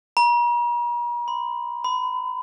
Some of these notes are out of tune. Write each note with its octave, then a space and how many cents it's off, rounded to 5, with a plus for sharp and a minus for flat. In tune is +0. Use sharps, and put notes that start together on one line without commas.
A#5 +45
C6 -45
B5 +40